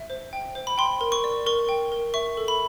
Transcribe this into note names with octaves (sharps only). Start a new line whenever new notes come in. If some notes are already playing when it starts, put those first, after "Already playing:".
Already playing: E5
C5
G5
C5
B5
G5 C6
A#4
C#6
D5
A#4 C#6
G5
A#4
E5 C#6
A4
B5